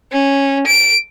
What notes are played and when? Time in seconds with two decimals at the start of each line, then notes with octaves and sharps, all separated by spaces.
0.12 C#4
0.67 D7